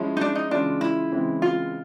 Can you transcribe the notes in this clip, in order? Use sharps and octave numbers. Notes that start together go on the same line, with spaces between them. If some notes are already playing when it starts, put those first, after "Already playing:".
Already playing: F3 G#3 C#4 E4
D#4
D4
D#4
C#3 E3 G#3 C#4 D4 F4
E4
C#3 E3 G#3 C4
F4